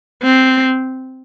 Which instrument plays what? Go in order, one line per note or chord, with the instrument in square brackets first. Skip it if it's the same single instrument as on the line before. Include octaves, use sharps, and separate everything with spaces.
[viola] C4